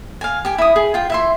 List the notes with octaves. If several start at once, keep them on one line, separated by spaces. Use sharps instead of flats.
F5 G#5
G4 G#5
E4 D#6
G#4
F4 G5
E4 E5 C6